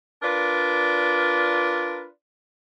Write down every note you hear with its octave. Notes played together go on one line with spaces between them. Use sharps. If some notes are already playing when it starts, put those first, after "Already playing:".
D4 F4 A#4 B4 D5